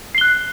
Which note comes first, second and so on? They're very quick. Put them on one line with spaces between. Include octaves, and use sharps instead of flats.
C7 G7 F#6